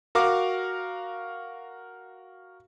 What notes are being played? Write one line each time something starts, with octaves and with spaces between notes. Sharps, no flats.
F#4 A#4 F5 D6